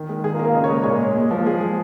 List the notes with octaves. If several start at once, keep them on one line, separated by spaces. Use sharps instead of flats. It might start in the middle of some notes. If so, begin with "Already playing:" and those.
Already playing: D#3
G#3
D#3 G#4
F4 A#4
A#3
F4 A#4
C#3 D#5
C#5
G#3 A#4
A#2 G#4 C#5
G#3
G#3
F3
G#3 G#4
F3